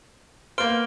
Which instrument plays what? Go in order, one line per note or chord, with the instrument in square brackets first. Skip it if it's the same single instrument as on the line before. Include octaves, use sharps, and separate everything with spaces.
[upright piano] A#3 B3 C5 [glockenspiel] F6 D7 G7